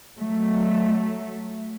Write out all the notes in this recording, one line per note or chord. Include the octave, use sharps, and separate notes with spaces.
F#3 A3